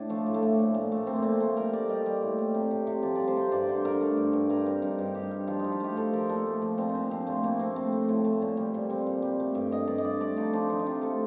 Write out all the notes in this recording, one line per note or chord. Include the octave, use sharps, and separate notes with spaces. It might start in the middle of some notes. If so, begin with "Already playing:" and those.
Already playing: A2 D4 D5
F3 A3
A2
A3
A2
A#2
A#2
A3
A3 C4
A#3
A#2 C4
A3
G3 A#4
G3 D5
G3 D#5
G3
A2
G3
C3
C3
C3
F3 D5
C3 D5
C5
C3
G2 D5
D3 C5
D3 A#4
A3
G2
G2
G2 A#4
G3 C4
G2 D#4
G2 G4
G2 G4
G3
F3 F4
F3 D#4
F4
A3 G4
F3 A4
F3 A#4
A#2 A4
A3
F3
A#2 C4
D#4
A#2 D4
F3 C4
A#2 A3
A3 A#3
A3 C4
A3 C4
A3
A2
A3
A#2
G3
A#2
G3 C4
A#2
G3
A3
G2
G2 D#5
G2 D5
D#5
G2 D5
A3 D5
F3 D#4
F3 D4
F3 D#4
D#4
C3 F4
A3 A4